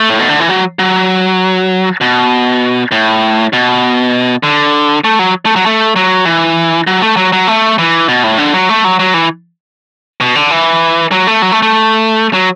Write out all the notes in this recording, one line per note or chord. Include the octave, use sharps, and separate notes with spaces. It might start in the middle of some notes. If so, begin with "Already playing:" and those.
Already playing: A3
A2
B2
D3
E3
F#3
F#3
B2
A2
B2
D3
A3
F#3
A3
F#3
A3
F#3
E3
F#3
A3
F#3
F#3
A3
E3
B2
A2
D3
F#3
A3
F#3
F#3
E3
B2
D3
E3
F#3
A3
F#3
A3
A3
F#3